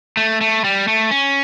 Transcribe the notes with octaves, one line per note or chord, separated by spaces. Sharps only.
A3
A3
G3
A3
C#4